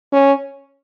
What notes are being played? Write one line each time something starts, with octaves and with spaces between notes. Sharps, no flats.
C#4